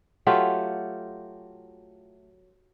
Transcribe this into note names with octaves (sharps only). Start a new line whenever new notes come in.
F#3 A3 F4 G4